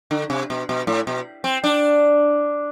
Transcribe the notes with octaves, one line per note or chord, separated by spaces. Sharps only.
D3
C3
B2
B2
A2
B2
C4
D4